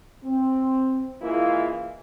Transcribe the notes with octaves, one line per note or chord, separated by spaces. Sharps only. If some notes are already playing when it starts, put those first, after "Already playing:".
C4
C#3 E3 G#3 A#3 E4 F4